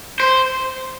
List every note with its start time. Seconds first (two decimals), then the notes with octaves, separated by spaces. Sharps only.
0.20 C5